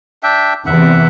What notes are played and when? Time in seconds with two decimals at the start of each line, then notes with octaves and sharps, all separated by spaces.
0.23 D4 E5 G5
0.66 E2 C3 E3 E5 F#5